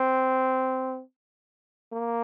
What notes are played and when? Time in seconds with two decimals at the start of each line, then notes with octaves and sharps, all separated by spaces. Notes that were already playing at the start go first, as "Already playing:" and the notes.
Already playing: C4
1.92 A#3